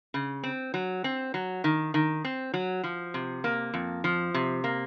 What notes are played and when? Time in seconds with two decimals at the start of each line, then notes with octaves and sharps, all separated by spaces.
0.14 C#3
0.44 C4
0.74 F#3
1.04 C4
1.34 F#3
1.64 D#3
1.94 D#3
2.25 C4
2.54 F#3
2.84 F3
3.14 C3
3.44 A#3
3.74 F2
4.04 F3
4.34 C3
4.64 A#3